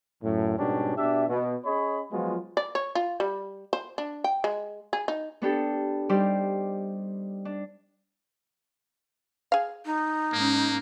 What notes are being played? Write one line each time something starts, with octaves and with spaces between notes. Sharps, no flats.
F#2 A2
G#2 B2 G3 C#4 D4 G4
B2 D4 G4 E5
B2
C#4 G#4 C#5 D#5 B5
F3 F#3 G#3 B3 F4 F#4
D5
C#5
F4
G3
C5
D4
G5
G#3
G#4
D#4
B3 D4 G4 A4
G3 D#4 G4 C5 D5
D4
G#4 F5
D#4
G#2 A#3 C#4